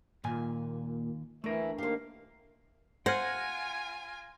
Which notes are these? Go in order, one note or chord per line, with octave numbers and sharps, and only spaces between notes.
D#2 A#2 G#5
D2 E3 A3 E4 A#4
D#3 A#3 G4 C5 F5
F4 C5 F#5 G#5 F6 G#6 A#6